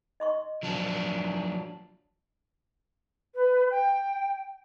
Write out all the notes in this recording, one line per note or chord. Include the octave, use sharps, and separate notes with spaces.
D#5 C6 C#6
F3 F#3 D4
B4
G5